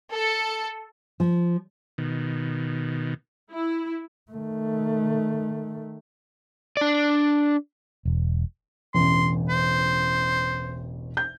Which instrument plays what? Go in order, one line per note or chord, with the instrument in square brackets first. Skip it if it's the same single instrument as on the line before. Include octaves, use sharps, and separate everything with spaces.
[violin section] A4 C#7
[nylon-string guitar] F3
[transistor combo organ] B2 D#3
[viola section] E4
[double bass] D#3 A3
[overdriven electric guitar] D4 D5
[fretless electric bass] E1
[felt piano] E1 A1 [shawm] C6
[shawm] C5
[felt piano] G6